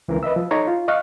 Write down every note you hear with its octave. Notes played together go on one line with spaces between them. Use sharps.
C#2 E3 C4 A#4
B4 D#5 E5 E6
F3
D#4 A4 C#5 A#5
F4
D#5 F5 C#6 F6 F#6